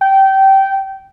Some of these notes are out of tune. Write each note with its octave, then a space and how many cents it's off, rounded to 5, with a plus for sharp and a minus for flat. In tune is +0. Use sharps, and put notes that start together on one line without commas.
G5 -20